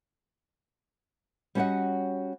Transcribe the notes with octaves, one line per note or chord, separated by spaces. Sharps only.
G3 C#4 F#4 C#5 D#5 F#5